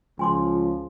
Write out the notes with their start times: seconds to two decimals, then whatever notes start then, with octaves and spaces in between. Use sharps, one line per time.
0.19 C#2 F3 G#5 C6 D6